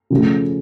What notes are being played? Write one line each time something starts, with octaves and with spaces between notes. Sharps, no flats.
C#3 F3 A3